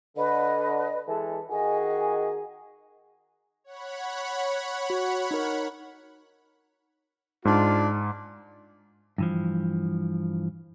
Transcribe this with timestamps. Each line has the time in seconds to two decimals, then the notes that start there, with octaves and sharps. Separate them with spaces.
0.17 D3 B4 D#5
1.08 E3 G#3 A4
1.50 D#3 F#4 G#4 D#5
3.64 C#5 F#5 B5
4.90 F#4
5.31 D#4 A#4
7.45 G#2 D4 F4
9.18 G2 E3 F3